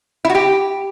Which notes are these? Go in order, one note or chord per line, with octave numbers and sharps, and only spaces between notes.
E4
F#4
G4